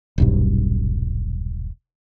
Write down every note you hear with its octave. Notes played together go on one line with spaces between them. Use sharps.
D#1 B1 G2